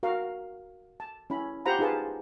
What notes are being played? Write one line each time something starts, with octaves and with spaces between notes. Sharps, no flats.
F#4 A#4 F5
A5
C#4 E4 B5
F4 G4 C5 F#5 A#5 B5
D#4 F4 G#4 B4 A5